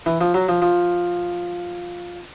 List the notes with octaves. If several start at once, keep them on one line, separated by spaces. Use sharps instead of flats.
E3
F3
F#3
F3
F3